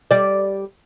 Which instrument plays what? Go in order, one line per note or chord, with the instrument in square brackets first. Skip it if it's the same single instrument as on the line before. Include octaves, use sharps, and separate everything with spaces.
[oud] G3 D5